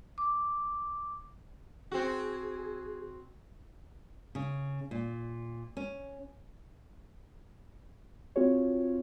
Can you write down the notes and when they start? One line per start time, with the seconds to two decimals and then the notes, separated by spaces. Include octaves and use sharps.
0.18 D6
1.92 C4 F#4 G#4
4.35 C#3
4.91 A#2
5.77 C#4
8.36 C4 F4 F#4 G#4 C#5